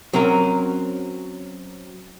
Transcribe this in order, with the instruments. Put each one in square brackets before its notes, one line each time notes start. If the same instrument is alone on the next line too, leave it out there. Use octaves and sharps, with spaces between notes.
[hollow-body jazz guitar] F#3 C4 C#4 A#4